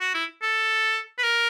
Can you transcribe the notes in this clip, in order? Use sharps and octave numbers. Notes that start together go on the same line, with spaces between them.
F#4
E4
A4
B4
A#4